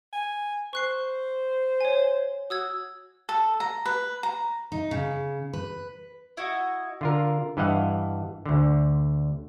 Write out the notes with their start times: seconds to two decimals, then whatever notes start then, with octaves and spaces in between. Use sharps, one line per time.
0.13 G#5
0.73 C5 C#6 F#6 C7
1.81 C#5 G#5
2.50 F#4 D#6 E6 G#6
3.29 A4
3.60 A#5
3.86 B4
4.23 A#5
4.72 D#4
4.91 C#3
5.53 B4
6.37 E4 F#4 D#5
7.01 D3 F4 A#4
7.57 G2 E3 D#5 F5 F#5
8.46 D2 D3